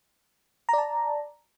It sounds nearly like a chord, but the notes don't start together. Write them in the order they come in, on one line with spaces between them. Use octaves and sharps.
A#5 D5 A5